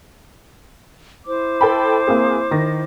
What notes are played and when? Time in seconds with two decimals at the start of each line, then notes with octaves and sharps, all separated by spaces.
1.25 E4 C5 D6
1.61 A4 G5 B5
2.07 A#3 C4 G#4
2.51 D#3 A#6